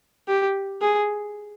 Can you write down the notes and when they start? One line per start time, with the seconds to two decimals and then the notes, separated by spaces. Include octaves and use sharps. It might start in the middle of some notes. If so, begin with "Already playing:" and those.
0.28 G4
0.81 G#4